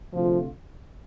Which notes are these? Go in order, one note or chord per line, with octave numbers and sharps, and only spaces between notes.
D2 C3 F3 A3 F4